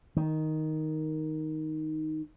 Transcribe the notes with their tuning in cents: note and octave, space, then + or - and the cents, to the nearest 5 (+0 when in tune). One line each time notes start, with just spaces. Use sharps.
D#3 +5